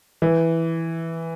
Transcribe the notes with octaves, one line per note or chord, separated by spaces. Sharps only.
E3